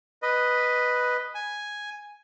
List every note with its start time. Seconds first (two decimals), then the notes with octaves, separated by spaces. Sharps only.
0.22 B4 D#5
1.35 G#5